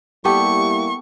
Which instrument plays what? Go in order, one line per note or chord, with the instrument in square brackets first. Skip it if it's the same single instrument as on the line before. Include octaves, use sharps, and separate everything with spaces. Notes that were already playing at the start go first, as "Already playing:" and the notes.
[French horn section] G3 A#3 E4 [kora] B3 G4 A4 [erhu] C#6